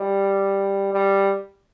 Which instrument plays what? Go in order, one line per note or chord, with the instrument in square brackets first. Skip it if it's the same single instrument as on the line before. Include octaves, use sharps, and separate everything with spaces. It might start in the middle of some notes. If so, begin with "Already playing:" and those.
Already playing: [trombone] G3
G3